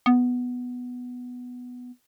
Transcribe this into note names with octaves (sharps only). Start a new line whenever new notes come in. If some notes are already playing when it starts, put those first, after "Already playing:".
B3